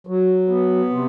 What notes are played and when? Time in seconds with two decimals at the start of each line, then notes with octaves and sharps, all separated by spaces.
0.07 F#3
0.48 B3
0.89 C3